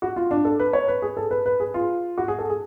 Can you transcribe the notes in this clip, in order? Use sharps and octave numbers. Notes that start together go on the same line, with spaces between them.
F#4
F4
D4
A4
B4
C#5
B4
G#4
A4
B4
B4
G#4
F4
F#4
G#4
A4
G#4